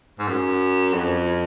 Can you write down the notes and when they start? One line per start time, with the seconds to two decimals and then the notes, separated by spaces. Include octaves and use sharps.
0.19 G#2
0.29 F#2
0.94 F2